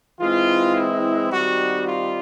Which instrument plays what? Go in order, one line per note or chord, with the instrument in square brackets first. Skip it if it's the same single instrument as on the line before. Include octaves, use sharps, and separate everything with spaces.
[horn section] E3 G#3 C4 F4
E4
D#3 G3 C4 D#4 F#4
F4